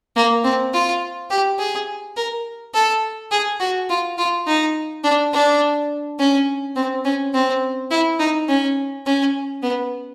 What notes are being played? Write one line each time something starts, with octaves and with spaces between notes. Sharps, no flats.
A#3
C4
F4
G4
G#4
A#4
A4
G#4
F#4
F4
F4
D#4
D4
D4
C#4
C4
C#4
C4
E4
D#4
C#4
C#4
B3